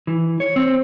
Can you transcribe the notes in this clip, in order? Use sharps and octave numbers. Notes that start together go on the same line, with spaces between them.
E3
C#5
C4